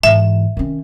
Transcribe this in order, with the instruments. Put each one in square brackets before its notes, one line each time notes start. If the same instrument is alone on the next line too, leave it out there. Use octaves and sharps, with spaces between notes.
[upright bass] G#2 E3 [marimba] E5
[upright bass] D#3 C#4